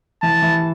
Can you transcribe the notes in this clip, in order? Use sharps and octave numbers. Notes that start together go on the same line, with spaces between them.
E3 A5
E3